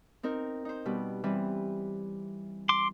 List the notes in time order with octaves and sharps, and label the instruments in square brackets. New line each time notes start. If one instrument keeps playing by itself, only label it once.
[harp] C4 D#4 A#4
D#4 C5
B2 G3
E3 G3 C4
[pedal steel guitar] C6 D6